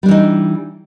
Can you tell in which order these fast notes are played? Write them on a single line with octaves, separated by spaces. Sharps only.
G3 D4 E3 D#4